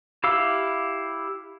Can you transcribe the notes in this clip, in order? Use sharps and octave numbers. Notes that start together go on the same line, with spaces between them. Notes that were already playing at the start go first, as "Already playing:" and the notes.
E4 G4 F5 E6